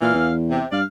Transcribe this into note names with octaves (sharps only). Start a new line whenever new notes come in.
A#2 E3 F5
E2
C3
G2 D5 F5